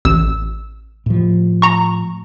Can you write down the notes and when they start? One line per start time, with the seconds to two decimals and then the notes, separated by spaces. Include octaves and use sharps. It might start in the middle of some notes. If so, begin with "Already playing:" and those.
0.05 A1 E6
1.06 A2 F3
1.62 A#5 C#6